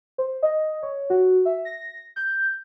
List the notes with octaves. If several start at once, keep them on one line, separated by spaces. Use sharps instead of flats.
C5
D#5
C#5
F#4
E5
A#6
G6